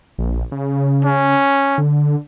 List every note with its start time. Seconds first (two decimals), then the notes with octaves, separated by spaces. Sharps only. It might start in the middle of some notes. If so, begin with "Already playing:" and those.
0.19 A#1
0.52 C#3
1.04 C#4
1.78 D3